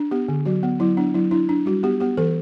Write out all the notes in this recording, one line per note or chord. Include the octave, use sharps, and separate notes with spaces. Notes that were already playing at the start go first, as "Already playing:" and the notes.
Already playing: D4
B3 G4
D3
F#3 F#4
B3
F#3 E4
B3 D4
F#3 E4
D4 E4
D4
G3 F#4
B3 G4
B3 G4
E3 A4